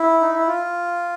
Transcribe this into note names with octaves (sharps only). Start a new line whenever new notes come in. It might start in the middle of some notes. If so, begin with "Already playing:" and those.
Already playing: E4
D#4
E4
F4